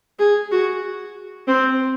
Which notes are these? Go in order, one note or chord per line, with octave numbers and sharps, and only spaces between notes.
G#4
F#4
C4